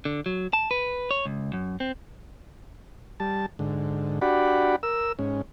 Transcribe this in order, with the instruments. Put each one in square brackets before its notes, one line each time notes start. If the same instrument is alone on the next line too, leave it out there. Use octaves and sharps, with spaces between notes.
[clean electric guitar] D3
F#3
A5
B4
C#5
C#2
F#2
C4
[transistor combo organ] G3 A5
G#2 D3
D4 F#4 G4 D5 F#5 B5
A#4 E6
G#2 C#4